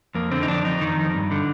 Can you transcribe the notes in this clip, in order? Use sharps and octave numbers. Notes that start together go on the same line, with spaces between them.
F2 A#3
D3 C4
D#4
F2 D4
F2 D#4
D#3
F2
G2
D3